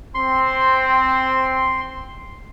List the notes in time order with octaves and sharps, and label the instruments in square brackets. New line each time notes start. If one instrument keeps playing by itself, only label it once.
[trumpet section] C4 [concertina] C6